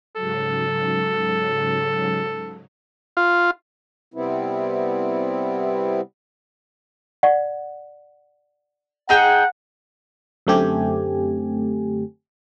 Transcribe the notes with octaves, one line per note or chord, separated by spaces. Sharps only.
G#2 C#3 F#3 A4
F4
C3 G3 B3 C4 E4
D5 F#5
D#4 G#4 F#5 G5
F#2 D3 A3 C4 G4 G#5